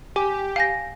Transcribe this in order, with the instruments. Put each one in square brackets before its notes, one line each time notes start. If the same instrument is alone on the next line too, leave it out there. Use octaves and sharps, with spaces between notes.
[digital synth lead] G4 [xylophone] G#5 D6
[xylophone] F5 G#5 A#6